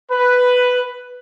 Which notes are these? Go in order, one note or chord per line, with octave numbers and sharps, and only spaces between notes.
B4